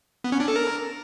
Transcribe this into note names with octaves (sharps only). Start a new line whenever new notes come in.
B3
C#4
D4
A4
A#4